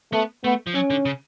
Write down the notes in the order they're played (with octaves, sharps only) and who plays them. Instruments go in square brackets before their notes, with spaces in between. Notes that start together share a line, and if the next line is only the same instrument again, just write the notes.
[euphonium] A3 [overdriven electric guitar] B3
[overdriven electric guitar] A3 [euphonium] B3
[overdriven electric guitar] F3
[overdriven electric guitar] F#3 [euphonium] C#4
[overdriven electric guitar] D3
C#3